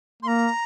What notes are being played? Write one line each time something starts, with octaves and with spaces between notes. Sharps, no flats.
A#3 C6
A#5